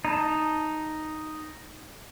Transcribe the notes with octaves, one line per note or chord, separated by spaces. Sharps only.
D#4 A5